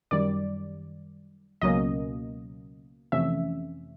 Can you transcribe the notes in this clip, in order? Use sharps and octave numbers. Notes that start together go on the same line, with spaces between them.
F#2 D#3 G3 D5
C#2 B2 F#3 A#3 C#4 D#5
F2 C3 E3 A3 C#4 E5